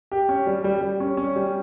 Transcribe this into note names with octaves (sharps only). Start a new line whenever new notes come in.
G4
C#4
G3
G3
G3
C#4
C#4
G3